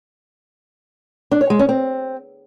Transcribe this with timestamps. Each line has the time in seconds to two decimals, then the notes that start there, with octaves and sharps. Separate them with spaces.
1.31 D4
1.41 C#5
1.50 G#3
1.59 C#4
1.69 C4